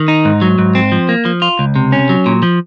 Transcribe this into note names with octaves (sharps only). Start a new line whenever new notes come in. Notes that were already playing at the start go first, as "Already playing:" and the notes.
Already playing: D#3
D#4
G#2
F#3
G#2
C4
F3
A#3
F3
F4
C#2
C3
C#4
F#3
A#2
F3